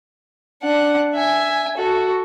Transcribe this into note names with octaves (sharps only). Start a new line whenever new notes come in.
D4 F#5
E5 G#5
F#4 A4